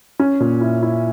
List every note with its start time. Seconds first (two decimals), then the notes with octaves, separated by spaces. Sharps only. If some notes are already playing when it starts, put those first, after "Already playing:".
0.19 C#4
0.40 A#2
0.61 E4
0.83 E4